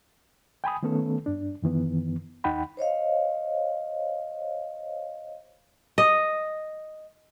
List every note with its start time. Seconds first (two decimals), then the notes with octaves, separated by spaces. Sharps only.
0.64 G5 G#5 B5 D#6
0.83 D#3 A3 B3 C#4 A4
1.26 G2 D4
1.62 F#2 D#3 E3 B3
2.44 D#2 D#4 F#5 G5 B5
2.77 C5 C#5 D#5 F5
5.98 D#5